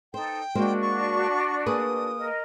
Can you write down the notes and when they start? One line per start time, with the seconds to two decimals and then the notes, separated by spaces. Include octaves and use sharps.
0.14 D#4 A4 C5 G5
0.55 G#3 A#3 D4 F#4 C5
0.82 C#6
1.66 A#3 G#4 B4 D#6
2.19 A#4 D#5